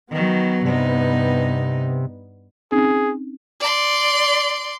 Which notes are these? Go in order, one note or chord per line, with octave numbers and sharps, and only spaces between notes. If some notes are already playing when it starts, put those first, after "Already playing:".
D#3 F#3 B3
G2 C3 D#4
C4 C#4 D#4 G#4
D5 C6